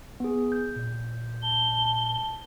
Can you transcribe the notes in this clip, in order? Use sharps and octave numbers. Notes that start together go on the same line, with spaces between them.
B3 G#4
G6
A#2
A5 G7